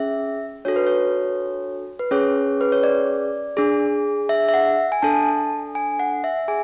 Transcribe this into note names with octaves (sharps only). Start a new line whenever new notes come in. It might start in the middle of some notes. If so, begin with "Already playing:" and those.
Already playing: C#4 G#4 E5
D4 F#4 A4 C#5
B4
C#5
B4
C#4 G#4 C#5
B4
C#5
D5
D4 G#4
E5
E5
F#5
G#5
D4 A4 A5
G#5
F#5
E5
G#4 G#5